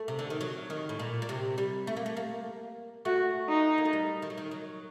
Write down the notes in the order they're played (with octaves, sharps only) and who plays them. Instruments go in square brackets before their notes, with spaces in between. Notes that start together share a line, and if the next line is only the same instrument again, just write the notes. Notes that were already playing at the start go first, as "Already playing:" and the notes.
Already playing: [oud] A3
C3
D3
D#3
F#3
D#3
A2
A#2
A#2
C3
G3
A3
A#3
A3
A#3
[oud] A3 [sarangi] F#4
[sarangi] D#4
[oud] A#3
A3
G3
D#3
F#3
D#3
F#3